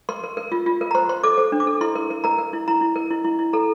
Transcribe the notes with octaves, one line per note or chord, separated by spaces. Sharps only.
A#4 C6
A#4
A#4
F4
F4
A#4
A#5
C5 C6
C5 C6
A4 D6
C5
D4
D6
A4
E4 C6
A#4
A#4
A#4 A#5
A#4
E4
E4 A#5
E4
A#4
E4
E4
E4
A4 A#5